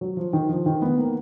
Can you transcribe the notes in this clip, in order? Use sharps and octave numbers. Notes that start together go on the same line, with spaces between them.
F#3
F3
D#3
F3
D#3
B3
A#3